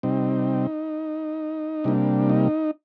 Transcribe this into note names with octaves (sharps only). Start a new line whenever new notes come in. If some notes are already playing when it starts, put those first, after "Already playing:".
C3 G3 C4 D#4
C3 G3 A#3 D4
D#4